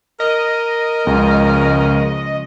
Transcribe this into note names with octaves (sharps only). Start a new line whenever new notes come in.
A#4 D#5
C#2 C#3 F3 G#3